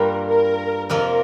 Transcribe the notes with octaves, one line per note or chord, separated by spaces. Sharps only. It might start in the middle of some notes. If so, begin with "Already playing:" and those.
Already playing: G2 G3 A#3 F4 A#4
A#4
F2 C3 F3 A#3 F4 A#4